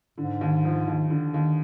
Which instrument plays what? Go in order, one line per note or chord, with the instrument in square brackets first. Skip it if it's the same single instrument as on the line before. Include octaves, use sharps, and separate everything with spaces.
[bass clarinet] G#2 [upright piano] D3
[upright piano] D#2
F3
D#2
D3
D#2